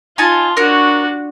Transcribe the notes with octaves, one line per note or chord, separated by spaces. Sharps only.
D#4 F4 G#5 A5
D4 F#4 A#4 C#5